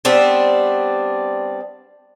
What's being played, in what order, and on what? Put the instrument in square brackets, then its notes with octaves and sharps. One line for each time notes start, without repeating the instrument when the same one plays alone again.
[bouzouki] G3 B3 C4 D4